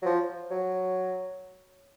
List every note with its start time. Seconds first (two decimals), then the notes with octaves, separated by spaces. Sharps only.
0.02 F#3
0.06 F3
0.51 F#3